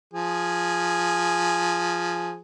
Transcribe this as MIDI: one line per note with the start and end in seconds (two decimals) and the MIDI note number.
0.14 2.40 53
0.14 2.40 68